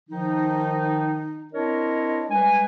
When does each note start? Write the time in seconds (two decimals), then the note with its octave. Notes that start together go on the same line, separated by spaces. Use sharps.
0.09 D#3 F3 D#4
1.53 C4 D4 E4 A#4 C#5 D#5
2.29 G3 G#3 B4 G#5